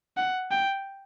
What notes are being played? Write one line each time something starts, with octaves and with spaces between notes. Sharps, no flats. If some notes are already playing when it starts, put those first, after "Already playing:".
F#5
G5